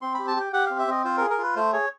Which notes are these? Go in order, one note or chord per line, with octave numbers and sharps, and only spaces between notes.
C4 C6
G4 B5
A5
G4 G5
G4 F#5
C4 F5
E5
C4 D#5
F4 C5
G#4 A#4
A#4
F4 B4
A3 C5
G#4 C#5